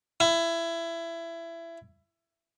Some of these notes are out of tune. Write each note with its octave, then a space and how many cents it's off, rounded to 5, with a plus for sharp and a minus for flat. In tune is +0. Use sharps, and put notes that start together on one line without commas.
E4 +20